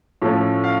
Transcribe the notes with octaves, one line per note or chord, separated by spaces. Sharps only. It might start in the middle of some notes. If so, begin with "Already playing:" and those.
A2 F3 A3 C#4
F5